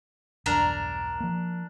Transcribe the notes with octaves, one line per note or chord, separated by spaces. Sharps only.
B1 E2 G2 D4 A#4 A#5
F3 A#3